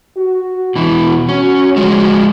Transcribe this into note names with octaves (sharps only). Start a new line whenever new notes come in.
F#4
B2 E3
C#4
F3 F#3 G#3